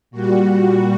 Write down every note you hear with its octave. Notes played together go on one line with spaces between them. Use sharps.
A#2 G3 F#4